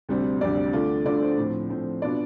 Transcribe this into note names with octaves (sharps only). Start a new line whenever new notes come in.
D2 C3 G3 C4
D2 C3 G3 C4 D5
D3 A3 D4 F4
D3 A3 D4 F4 D5
C5
A2 F3 C4
A2 F3 C4
B2 B3 D4 F4 D5